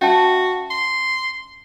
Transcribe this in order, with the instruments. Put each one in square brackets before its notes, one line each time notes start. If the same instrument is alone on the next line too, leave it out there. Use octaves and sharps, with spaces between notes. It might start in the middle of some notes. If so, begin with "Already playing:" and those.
[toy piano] C#4 E5 A5 [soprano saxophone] F#4
[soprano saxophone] C6